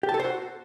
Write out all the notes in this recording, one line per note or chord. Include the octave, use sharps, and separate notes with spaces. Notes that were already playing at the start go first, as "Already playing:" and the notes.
G4
A5
A4
C5
F#4